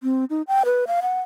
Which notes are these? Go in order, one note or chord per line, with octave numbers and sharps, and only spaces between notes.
C4
D#4
G5
B4
F5
F#5